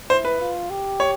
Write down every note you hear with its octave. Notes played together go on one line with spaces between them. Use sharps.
E4 C5
B4
F4
G4
C#5